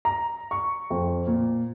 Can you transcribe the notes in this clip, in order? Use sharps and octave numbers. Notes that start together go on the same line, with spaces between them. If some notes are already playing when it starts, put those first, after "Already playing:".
A#5
C#6
F2
A#2